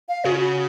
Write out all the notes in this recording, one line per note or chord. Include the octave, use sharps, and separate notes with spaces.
F5
C#3 F#4
F4
F#4